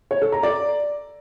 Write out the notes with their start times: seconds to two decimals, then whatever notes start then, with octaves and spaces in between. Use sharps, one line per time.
0.11 C#5
0.22 A4
0.32 A#5
0.43 D5